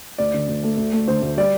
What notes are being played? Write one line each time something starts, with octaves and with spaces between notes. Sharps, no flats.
D2 D5
D3
D2
A3
D2
A3
D3 C5
D2
G3 D5